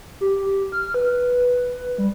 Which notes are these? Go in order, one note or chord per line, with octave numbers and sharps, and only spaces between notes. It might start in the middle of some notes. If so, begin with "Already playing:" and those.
G4
F6
B4
G3